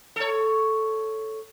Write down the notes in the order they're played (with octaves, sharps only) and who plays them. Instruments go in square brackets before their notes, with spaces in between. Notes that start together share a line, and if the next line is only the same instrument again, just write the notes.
[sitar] A4 C#5